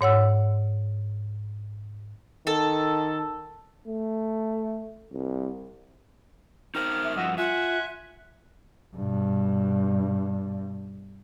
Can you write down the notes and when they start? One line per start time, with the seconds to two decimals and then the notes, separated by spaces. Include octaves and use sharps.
0.01 G#2 C#5 F#5 E6
2.47 D#3 A4
3.87 A3
5.13 C2
6.75 D#4 A#4 C5 F6
7.03 E5
7.16 G2 F3 F#4 D#5 E5 F#5
7.38 F4 E5 F#5 G#5 F#6
8.96 G2 B2